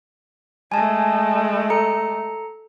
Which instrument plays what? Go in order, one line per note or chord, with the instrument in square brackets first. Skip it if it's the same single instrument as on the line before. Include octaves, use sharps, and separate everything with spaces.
[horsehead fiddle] G#3 A3 [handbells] G#5 A5
[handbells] A4 A#5 C#7